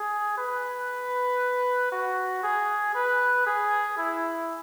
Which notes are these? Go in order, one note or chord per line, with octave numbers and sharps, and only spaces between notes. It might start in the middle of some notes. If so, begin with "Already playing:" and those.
Already playing: G#4
B4
F#4
G#4
B4
G#4
E4